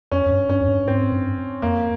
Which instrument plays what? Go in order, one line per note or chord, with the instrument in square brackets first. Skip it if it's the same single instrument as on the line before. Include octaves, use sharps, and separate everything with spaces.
[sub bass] F2 [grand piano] C#4
[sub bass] F2
G2
[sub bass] G2 [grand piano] C#4
[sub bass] F2
G2
[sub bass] G#2 [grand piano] C4
[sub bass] G2
[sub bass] F2 [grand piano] A#3